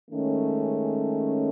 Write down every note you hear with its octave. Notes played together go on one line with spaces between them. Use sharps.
D#3 G#3 A3 C#4